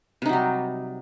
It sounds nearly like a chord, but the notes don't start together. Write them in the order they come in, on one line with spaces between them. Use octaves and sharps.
C3 D#4 F#3 G3